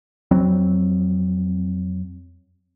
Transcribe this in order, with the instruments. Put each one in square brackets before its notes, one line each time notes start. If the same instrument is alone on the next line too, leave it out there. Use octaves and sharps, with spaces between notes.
[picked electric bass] F2 F#3 C4